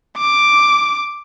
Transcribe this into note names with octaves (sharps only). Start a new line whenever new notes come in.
D6